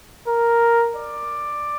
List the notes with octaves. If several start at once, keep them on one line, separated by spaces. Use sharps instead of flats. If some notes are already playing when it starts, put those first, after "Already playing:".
A#4
D5